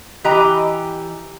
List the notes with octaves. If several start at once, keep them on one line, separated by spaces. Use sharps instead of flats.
E3 G4 D#5 A#5